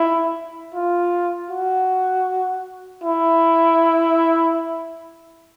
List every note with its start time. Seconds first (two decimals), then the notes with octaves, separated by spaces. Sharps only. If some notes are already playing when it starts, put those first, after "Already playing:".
Already playing: E4
0.75 F4
1.50 F#4
3.04 E4